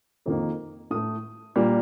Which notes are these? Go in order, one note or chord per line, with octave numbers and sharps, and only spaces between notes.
F2 D#3 A#3
A2 A3 D#6
A#2 G3 A#3